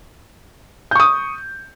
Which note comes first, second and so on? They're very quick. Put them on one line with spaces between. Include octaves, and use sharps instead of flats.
G6 C#6 D#6